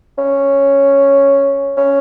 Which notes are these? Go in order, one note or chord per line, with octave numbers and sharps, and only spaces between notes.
C#4
C#4